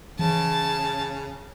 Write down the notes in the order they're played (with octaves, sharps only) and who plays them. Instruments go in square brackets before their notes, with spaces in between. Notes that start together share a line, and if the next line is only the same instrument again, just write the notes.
[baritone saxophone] C#3 [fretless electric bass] E3 [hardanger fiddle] A5